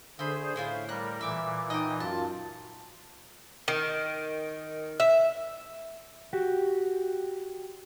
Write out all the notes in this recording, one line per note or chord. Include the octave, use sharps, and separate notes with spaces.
D3 A3 G#4 C5 B5
A2 C#4 E4 F4
G3 A#4 F#6
A#2 E3 E5 D6
D#4 D#5 G5
F#2 F4 A5
D#3
E5
F#4 G4